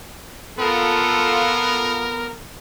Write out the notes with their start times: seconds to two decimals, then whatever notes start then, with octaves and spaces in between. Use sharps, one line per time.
0.59 B3 F4 A4 A#4